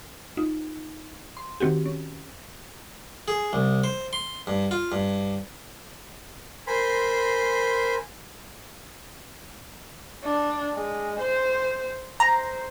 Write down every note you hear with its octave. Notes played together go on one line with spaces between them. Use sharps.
D#4 F4
C6
D#3 C4 F#4 G4
C#4
G#4
C2
C5
C6
G2
F4
G2
A#4 C5 G#5 B5 C6
D4
G#3
C5
C5 A#5